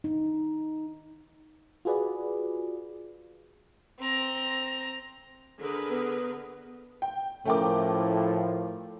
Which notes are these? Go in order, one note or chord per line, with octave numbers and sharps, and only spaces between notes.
D#4
F4 F#4 G#4 B4 D5
C4 A#5
D3 G#4 A#4 B4
B3
G5
A2 F3 A3 C#4 A#4 G5 D6